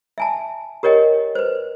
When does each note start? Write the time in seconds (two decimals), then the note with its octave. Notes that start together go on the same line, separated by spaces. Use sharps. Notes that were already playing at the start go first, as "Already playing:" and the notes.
0.18 E5 G#5 A5
0.83 G4 A#4 C#5 D#5 G5
1.35 B4 C5